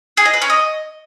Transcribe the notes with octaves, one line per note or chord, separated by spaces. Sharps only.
G#4
D#5
B4
C#4
D#5